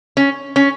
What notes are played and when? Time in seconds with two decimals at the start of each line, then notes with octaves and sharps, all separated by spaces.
0.17 C#4
0.56 C#4